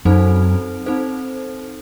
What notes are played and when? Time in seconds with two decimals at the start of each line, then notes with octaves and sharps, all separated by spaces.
0.05 F#2 C4 D#4 A4 C5
0.86 C4 D#4 A4 C5